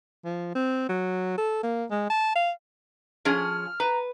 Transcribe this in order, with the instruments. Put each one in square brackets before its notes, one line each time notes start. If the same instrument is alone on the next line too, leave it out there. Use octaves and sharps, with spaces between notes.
[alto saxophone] F3
C4
F#3
A4
A#3
G#3
A5
F5
[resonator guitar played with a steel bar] F3 C#4 G#4 [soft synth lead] F6
[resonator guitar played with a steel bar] B4 [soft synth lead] A#5